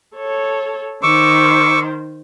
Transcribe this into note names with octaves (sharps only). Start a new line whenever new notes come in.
A4 C#5
D#3 C5 C#6 D6 E6